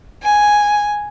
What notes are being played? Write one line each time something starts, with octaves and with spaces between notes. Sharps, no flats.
G#5